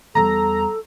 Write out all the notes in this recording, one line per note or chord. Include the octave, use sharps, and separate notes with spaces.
E2 G3 A4 A#5